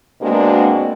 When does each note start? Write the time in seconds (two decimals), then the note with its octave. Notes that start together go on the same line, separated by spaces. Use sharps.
0.21 B2 G#3 A#3 C4 D4 F#4